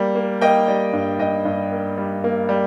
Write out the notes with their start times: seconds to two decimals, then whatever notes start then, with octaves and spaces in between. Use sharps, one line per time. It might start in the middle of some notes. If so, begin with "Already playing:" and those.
Already playing: G3 A#3
0.15 A#3
0.41 A#3 D#5 G5
0.68 G3
0.93 G2
1.19 G2 D#5 G5
1.45 G2
1.72 A#3
1.98 G3
2.24 A#3
2.49 G3